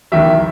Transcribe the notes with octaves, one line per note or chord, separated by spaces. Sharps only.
E2 D#3 F#3 E5